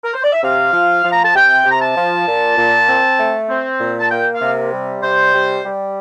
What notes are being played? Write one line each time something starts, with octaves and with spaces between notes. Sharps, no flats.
A#4
C5
D5
E5
C3 F5
F3
F3
A#5
A5
C3 G5
C3
A#5
A5
F3
A#2
A#2
C4
A3
C4
A#2
A5
A#3 G5
F5
C3
G3
C3 C5
G3
G3